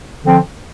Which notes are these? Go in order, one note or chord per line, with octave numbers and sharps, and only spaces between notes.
D3 F3 C4